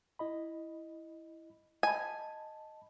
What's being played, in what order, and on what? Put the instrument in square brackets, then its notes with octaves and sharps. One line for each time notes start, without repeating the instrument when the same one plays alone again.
[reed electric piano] E4 D#5 B5
[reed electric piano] D#5 A5 B5 [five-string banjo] G#5